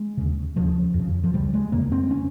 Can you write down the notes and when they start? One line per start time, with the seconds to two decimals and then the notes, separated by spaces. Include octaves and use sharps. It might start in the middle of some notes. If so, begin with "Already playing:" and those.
Already playing: G#3
0.17 D#2 C#3
0.56 D#2 C#3 F3
0.94 F2
0.99 C#3
1.24 F3
1.34 C#2 C#3 G3
1.54 G#3
1.72 F2 C#3 A#3
1.92 C4
2.11 C#4